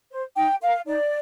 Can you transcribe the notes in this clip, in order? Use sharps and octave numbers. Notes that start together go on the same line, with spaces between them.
C5
D#4 G5
A#4 F5
D#4 D5